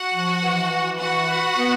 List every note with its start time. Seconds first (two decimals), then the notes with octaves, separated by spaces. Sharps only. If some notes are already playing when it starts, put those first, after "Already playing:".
Already playing: F#4 F#5
0.13 F3
0.42 E3
0.70 E3
0.99 F#4 B4 F#5
1.28 B4
1.57 B3